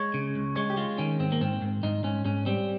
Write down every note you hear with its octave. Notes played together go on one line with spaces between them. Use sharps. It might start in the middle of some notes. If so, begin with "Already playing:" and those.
Already playing: G#3 C#5
C#3
C#2
G#3 C#5
G4
G#3 F4
D#3 C#4
G#2 C4
A#3
G#2 C4
G#2
G#2 D#4
G#2 C#4
G#2 C#4
G3 C4